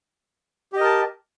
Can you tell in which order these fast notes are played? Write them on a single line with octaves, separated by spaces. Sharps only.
G4 D#5 A#4 A5